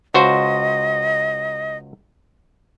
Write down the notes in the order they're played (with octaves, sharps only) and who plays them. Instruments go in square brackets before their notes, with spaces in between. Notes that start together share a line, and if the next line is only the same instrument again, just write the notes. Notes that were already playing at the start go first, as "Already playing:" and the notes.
[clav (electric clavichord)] C#2 F#4 C5 [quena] D#5